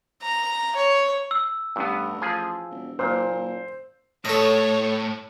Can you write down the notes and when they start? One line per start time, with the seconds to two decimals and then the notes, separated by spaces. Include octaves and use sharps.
0.22 A#5
0.75 C#5
1.31 E6
1.76 A1 G2 B3
2.22 F3 G#4
2.70 E1
2.99 F#1 A#2 C5
4.25 A2 A4 C#5 D#5